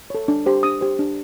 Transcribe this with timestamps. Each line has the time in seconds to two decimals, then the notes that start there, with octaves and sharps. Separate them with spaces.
0.10 A4 C#5
0.28 D4
0.46 G4 C5
0.63 D4 D#6
0.81 G4 C5
0.99 D4